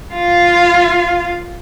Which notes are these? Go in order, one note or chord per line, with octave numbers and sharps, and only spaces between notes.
F4 F5